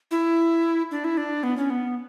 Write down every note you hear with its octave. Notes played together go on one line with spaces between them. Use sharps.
E4
D4
E4
D4
B3
C#4
B3